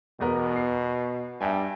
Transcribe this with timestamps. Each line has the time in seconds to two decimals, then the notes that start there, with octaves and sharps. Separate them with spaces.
0.20 E2 B2 B3 A#4
0.56 C7
1.40 G2 E5 G5 G#5